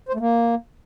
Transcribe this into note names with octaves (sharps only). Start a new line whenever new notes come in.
C5
A3
A#3